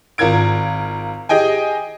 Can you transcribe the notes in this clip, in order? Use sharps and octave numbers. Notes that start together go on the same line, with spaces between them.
G#1 F4 A#4 G#6 D7
G4 G#4 D#5 G5 G#5